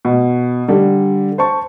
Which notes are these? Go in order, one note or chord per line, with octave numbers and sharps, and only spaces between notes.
B2
D3 G3
C5 A5 C#6